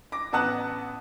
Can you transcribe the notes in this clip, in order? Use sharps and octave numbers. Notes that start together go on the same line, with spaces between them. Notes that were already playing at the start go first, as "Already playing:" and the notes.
D6 A#6
A1 B3 F#5 A5 D#6 F#6